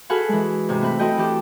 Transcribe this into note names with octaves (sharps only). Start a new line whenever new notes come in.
F#4 G#4 A4 B4 F5 F#5
E3 G#3
G#2 C3
A3 C4 B4
C4 E4 F#4 A4 D#5 G5
E3 G4 A4